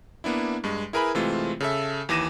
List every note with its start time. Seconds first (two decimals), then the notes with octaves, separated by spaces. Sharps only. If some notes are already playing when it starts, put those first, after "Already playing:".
0.24 A#3 B3 D4 E4
0.64 G2 G#3
0.93 E4 G#4 A#4 B4 G#5 B5
1.15 C3 E3 G#3 A3 C4 F4
1.60 C#3 A4 E5
2.09 D#2 E3 D6 A#6 D#7 E7